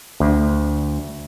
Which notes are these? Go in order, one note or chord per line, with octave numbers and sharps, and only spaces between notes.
D2